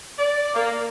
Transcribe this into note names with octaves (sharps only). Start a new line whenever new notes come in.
D5
A#3